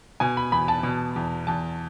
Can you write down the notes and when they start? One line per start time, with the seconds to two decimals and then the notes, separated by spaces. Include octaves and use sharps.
0.20 B2 G#5
0.37 B5
0.52 E2 B5
0.68 A5
0.83 B2
1.16 E2
1.47 E2 A5